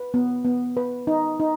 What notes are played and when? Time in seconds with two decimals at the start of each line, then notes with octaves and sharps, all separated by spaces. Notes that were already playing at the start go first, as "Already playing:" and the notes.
Already playing: B4
0.14 B3
0.45 B3
0.77 B4
1.07 D#4
1.40 D#4